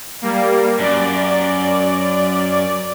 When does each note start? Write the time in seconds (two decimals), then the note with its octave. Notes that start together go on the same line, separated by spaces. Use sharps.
0.22 G3 A#3
0.79 F#2 D5